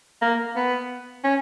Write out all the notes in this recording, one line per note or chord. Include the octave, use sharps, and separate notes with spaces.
A#3
B3
C#4